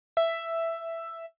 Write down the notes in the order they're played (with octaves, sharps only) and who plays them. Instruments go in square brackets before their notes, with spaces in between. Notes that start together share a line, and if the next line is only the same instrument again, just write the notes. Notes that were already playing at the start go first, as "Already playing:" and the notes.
[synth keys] E5